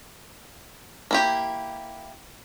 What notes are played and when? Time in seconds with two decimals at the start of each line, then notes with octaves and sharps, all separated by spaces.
1.11 A#3 E4 G4